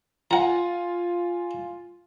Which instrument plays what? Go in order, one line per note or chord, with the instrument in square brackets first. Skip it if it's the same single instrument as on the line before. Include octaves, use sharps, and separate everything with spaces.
[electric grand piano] F4 G#5 [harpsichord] F#5 A#5